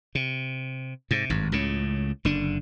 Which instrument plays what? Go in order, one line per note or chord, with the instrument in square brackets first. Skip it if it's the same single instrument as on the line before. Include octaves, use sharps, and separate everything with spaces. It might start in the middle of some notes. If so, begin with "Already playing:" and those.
[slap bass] C3
G#2 C3
G#1 G2
C#2 A2 C#3
F#1 D3 D4